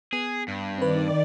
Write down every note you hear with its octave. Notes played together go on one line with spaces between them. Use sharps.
B3 G#4
G2
D#3 C4 B4 D5